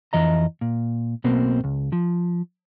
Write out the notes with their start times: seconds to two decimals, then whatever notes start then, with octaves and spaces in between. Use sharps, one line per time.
0.13 F2 E3 D#5 A#5
0.61 A#2
1.24 B1 B2 A#3 C4
1.64 C#2
1.92 F3